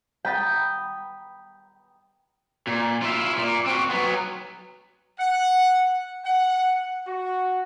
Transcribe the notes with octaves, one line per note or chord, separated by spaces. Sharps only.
G5 A#5 B5 D#6 G6 A6
A#2
E4 F4
A#2
C4 F#4
F#3 B3
F#5
F#5
F#4